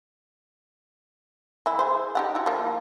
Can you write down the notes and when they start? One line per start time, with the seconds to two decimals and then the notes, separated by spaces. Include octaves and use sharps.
1.66 E3 E4
1.79 G#4 C5
2.15 D#4 G4 F#5
2.35 E4 F#4
2.46 F3 A#3